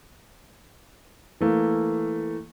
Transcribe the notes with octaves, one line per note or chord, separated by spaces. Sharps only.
E3 A3 A#3